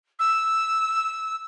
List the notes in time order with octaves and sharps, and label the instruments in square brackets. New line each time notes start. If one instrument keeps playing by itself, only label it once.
[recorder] E6